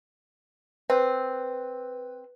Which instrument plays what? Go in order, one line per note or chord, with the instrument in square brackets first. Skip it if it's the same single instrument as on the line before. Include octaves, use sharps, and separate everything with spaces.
[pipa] C4 [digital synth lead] B4